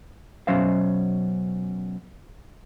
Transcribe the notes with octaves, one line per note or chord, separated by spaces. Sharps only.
B2 F#3 C#4 C5 E5 F5